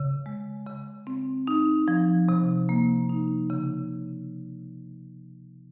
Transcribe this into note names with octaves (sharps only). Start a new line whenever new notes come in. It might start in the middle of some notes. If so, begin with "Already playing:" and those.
Already playing: C#3
G#3
C#3
C4
D#4
F3
C3
A#3
D#4
C#3